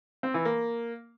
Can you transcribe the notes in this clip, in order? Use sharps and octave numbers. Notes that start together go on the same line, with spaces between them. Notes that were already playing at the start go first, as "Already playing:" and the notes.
C4
E3
A#3